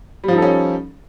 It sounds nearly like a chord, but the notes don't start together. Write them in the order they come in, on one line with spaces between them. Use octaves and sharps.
G3 F3 D#4 A4 C#4